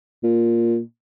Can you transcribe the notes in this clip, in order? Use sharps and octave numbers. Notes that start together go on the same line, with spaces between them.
A#2